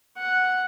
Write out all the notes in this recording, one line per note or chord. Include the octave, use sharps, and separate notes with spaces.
F#5